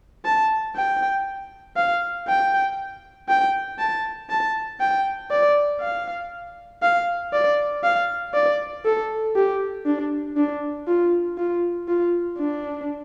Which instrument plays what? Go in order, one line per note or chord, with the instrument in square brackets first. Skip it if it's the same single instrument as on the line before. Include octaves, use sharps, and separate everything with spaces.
[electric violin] A5
G5
F5
G5
G5
A5
A5
G5
D5
F5
F5
D5
F5
D5
A4
G4
D4
D4
F4
F4
F4
D4